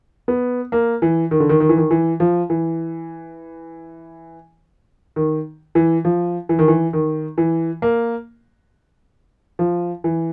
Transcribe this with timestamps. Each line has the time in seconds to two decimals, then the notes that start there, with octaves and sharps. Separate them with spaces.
0.28 B3
0.72 A#3
1.02 E3
1.31 D#3
1.40 D3
1.49 D#3
1.60 D#3
1.69 E3
1.77 D#3
1.91 E3
2.20 F3
2.50 E3
5.16 D#3
5.75 E3
6.05 F3
6.49 E3
6.59 D#3
6.68 E3
6.93 D#3
7.38 E3
7.82 A#3
9.59 F3
10.04 E3